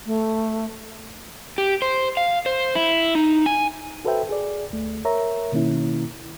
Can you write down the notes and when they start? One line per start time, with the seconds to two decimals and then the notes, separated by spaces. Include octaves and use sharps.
0.06 A3
1.58 G4
1.82 C5
2.17 F5
2.46 C5
2.75 E4
3.15 D#4
3.46 G#5
4.05 F#4 A4 B4 C5 E5 G5
4.29 G#4 D5
4.70 D2 A3
5.05 A#4 C#5 E5 A#5
5.52 B2 D#3 A#3 C#4 E4